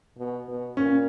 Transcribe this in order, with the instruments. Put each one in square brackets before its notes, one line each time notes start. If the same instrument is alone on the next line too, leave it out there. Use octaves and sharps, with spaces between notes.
[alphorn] B2
B2
[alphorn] A#2 [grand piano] C#4